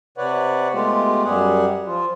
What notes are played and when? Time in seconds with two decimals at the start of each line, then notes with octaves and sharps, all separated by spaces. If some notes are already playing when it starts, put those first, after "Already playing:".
0.18 C3 B4 C#5 D5 F#5
0.74 G#3 A3 B3 F4 G4
1.24 F#2 G3 G4 G#4 F#5
1.87 F3 F4